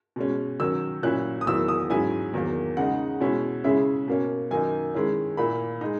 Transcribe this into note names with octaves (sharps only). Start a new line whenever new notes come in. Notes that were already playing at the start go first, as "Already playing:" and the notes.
B2 G#3 C#4
D#3 F#3 C#4 E6
A#2 F#3 C#4 E4 F#6
D#6
E2 D#3 F#3 A#3 E4 E6
D#6
G#2 F#3 C#4 E4 G#5
E2 D#3 F#3 A#3
C#3 G#3 D#4 F#5
B2 G#3 C#4 E4
C#3 G#3 C#4 E4 E5
B2 A#3 C#4
F#2 D#3 A#3 D#4 G#5
D#3 G#3 C#4 E4
A#2 A#3 E4 B5
G#3 D#4